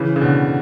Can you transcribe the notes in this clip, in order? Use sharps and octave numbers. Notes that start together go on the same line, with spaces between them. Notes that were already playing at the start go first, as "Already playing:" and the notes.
Already playing: C#3 E3
C#3
B2 D3